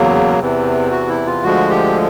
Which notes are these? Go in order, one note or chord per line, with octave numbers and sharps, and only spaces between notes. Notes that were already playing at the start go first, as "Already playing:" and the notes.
Already playing: E2 C#3 F#3 A#3
E2 C3 E3
F#4
E4
F4
D2 D3 F3 G#3 F#4
G4